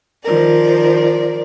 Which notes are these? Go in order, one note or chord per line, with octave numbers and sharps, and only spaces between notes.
D#3 F3 A#4 D5